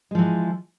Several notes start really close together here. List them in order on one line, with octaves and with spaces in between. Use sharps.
G#3 F3 E3